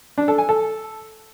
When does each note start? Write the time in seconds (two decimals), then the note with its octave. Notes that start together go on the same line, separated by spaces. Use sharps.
0.18 D4
0.28 A4
0.38 G#5
0.49 A4